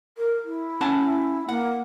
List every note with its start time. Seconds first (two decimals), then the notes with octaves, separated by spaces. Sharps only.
0.18 A#4
0.44 E4
0.81 C#4 F#5 A5
1.49 A#3 F#5